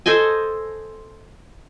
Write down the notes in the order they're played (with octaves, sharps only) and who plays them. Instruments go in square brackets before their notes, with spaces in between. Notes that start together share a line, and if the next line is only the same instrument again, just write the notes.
[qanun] A4 C5 D#5 G#5